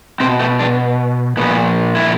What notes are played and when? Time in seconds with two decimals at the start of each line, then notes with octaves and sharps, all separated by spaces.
0.20 B2 C4
0.39 A3
0.59 D4
1.37 A#2 F3 B3
1.95 E4